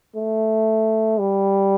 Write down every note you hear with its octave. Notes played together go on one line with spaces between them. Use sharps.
A3
G3